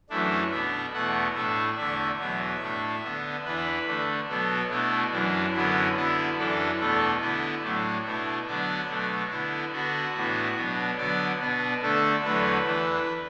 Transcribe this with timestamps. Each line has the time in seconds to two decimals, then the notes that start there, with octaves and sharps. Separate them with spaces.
0.10 F#2 E3 A3 D4 E4
0.51 B2 B3 D4 E5
0.94 E2 B2 A3 F#5
1.35 A2 A3 D4 E5
1.77 E2 D3 A3 D4 E5
2.20 E2 B2 F#3 E5
2.61 A2 A3 D4
3.04 D3 B3 D4
3.45 E2 E3 D4 B4
3.87 D3 A3 D4
4.29 B2 F#3 B3 A4
4.70 B2 A3 D4 E4
5.12 F#2 E3 D4
5.54 F#2 D3 F#3 B3 E4
5.96 D3 B3 D4 E4
6.38 F#2 E3 D4 A4
6.80 E2 B2 A3 D4 A4
7.21 D3 B3 D4 E4
7.63 A2 F#3 A3 D4
8.05 B2 A3 D4 E4
8.47 D3 F#3 B3 D4 D5
8.89 B2 F#3 A3 D4
9.30 D3 B3 D4 E4
9.73 D3 B3 D4 F#4
10.15 A2 E3 B3 D4
10.57 B2 F#3 D4
10.98 D3 F#3 B3 D5
11.40 B2 B3 D4
11.82 D3 A3 D4 A4
12.24 E2 D3 F#3 A3 B4
12.66 E2 E3 D4